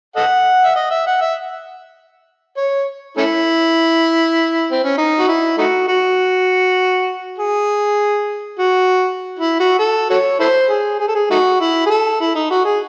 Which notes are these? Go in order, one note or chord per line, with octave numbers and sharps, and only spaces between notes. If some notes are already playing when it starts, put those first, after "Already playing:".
A4 D#5 F#5
E5
D#5
E5
F#5
E5
C#5
A3 C#4 E4
C4
C#4
D#4
F#4
E4
A3 D#4 F#4
F#4
G#4
F#4
E4
F#4
A4
F#4 A4 C#5
E4 A4 C5
G#4
G#4
A4
G#4
A3 D#4 F#4
E4
G#4
A4
E4
D#4
F#4
G#4